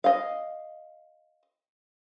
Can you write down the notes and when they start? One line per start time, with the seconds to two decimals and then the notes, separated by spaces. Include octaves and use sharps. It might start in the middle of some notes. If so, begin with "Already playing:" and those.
0.04 D#5 F5